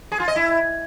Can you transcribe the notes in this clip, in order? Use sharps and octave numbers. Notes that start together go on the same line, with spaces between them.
G#4
F4
D#5
E4